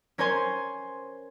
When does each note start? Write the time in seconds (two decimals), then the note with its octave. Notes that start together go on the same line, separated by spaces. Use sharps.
0.18 C#4 A#4 C5 C#5 G#5 C6